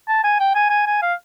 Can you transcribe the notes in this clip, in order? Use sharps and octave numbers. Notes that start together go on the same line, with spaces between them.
A5
G#5
G5
G#5
G#5
G#5
F5